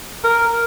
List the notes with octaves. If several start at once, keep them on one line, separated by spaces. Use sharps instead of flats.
A#4